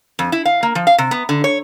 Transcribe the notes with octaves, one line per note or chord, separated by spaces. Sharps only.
F2
E4
F5
A#3
F3
F5
C3
B3
D3
C#5